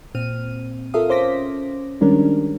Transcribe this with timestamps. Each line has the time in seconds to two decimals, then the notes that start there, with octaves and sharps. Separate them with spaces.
0.15 A#2 C4 F6 D#7
0.94 F4 A4 A#4 E5 F5 D#6
1.09 C#4 C5 D6 A#6 B6
2.01 D#3 G3 G#3 C#4 D4 A#4